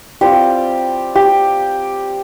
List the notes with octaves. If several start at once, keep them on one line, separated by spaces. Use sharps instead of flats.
G3 C4 F4 G4
G4